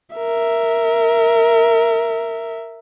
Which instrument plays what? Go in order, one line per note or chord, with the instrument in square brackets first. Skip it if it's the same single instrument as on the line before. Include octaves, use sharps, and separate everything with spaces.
[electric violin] A#4 E5